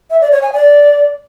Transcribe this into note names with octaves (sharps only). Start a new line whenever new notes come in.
E5
D5
C#5
G#5
D5